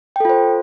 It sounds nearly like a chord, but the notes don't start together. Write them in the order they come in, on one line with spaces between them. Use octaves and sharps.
G5 A4 F4 C5